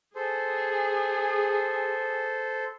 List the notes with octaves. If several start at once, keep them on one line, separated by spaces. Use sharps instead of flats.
G#4 A4 C5